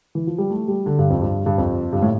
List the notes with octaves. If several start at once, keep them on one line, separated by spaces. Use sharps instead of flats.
E3
F3
G3
A3
G3
D3
G2
F2
G2
G2
F2
G2
A2